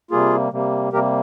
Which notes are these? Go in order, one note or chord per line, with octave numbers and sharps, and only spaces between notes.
C3 G3 A#3 F4 G#4
C3 G3 A#3
C3 G3 A#3 G4 A#4